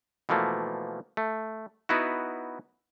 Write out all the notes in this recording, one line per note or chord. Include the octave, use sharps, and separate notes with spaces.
B2 E3 F3 A3 A#3
A3
B3 D#4 E4 F#4